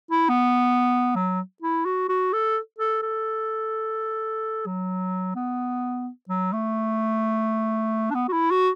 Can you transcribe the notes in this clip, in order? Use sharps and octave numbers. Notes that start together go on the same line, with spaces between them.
E4
B3
F#3
E4
F#4
F#4
A4
A4
A4
F#3
B3
F#3
A3
D4
B3
F#4
E4
F#4